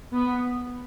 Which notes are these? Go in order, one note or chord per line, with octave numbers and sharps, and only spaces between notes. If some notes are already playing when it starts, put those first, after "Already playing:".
B3